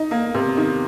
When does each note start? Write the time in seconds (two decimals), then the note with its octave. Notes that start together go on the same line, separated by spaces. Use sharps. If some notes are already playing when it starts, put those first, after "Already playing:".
Already playing: D#4
0.11 A#3
0.34 C3
0.57 D#3